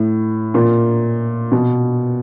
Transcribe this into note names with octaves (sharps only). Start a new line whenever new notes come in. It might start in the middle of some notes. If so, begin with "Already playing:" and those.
Already playing: A2
A#2
B2